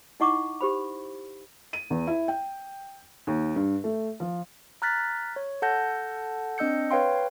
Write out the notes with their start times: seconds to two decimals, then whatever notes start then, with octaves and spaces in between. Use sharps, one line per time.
0.20 D#4 E4 D#5 F#5 C#6 D6
0.61 G4 C5 B5
1.73 D#7
1.90 E2
2.07 E4
2.28 G5
3.27 D#2
3.56 G2
3.84 A3
4.20 F3
4.82 A#5 F6 F#6 A6 B6
5.36 C#5
5.62 A4 F#5 A5 G6 A#6
6.58 C4 D4 D#5 E6 G6 C#7
6.91 B4 C#5 F5 G5 C6